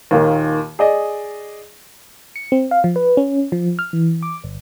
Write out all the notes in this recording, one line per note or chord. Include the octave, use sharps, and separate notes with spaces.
D#2 A#2 D#3
G#4 D5 D#5
C#7
C4
F5
F3
B4
C#4
F3
F6
E3
D6
G1